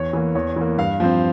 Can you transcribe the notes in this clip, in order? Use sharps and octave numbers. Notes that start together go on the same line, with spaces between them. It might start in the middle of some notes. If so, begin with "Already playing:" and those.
Already playing: E2 C#5
E3 A#3
E2 C#5
E3 A#3
G2 F5
F3 C4